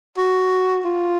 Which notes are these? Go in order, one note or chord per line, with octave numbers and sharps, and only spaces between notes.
F#4
F4